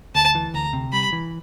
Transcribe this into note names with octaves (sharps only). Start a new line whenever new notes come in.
D2 A5
E3
D2 A#5
C3
G3 B5
E3